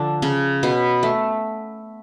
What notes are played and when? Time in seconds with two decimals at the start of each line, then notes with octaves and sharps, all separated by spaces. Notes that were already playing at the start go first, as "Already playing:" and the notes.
Already playing: D3 F3 D4
0.22 C#3 C#4
0.63 B2 B3
1.03 A3